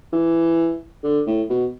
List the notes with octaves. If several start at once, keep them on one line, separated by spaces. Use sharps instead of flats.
E3
D3
A2
B2